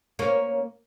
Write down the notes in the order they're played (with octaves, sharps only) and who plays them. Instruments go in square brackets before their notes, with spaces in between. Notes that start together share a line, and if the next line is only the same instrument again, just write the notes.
[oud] A#3 C#4